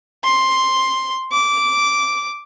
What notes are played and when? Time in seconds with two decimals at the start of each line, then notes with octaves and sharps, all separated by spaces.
0.24 C6
1.33 D6